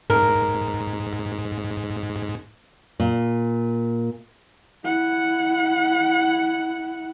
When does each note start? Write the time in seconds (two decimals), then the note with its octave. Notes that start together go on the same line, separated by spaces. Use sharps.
0.10 G#2 A#4
3.00 A#2
4.84 E4 F#5